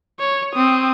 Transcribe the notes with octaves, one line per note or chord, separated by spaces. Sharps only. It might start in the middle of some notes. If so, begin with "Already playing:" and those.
C#5
C4 D#6